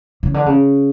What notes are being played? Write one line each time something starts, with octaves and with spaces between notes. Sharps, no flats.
C#3
D3
C#3